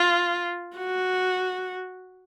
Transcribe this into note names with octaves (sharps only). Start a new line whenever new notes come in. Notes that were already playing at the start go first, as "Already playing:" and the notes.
Already playing: F4
F#4